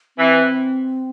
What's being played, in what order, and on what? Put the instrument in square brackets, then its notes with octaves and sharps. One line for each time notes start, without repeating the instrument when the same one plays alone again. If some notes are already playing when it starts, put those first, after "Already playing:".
[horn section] E3 [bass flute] C4